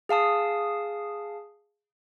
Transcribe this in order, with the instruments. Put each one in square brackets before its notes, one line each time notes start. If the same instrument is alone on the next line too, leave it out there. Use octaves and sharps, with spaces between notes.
[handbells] G#4 F5 A5 D#6